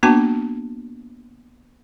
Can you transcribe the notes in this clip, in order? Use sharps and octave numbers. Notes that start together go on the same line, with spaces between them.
A#3 B3 D4 F#4 A5 D6